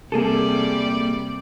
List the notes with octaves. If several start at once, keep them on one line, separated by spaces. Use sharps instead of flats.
C3 G3 A#3 G#4 A4 D5